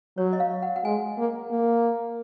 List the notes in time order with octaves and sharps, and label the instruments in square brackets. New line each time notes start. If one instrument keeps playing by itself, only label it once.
[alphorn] F#3 [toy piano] C#5
[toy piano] D#5
F5
F#5
F#5
[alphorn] G#3 [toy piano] G#5
[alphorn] A#3
A#3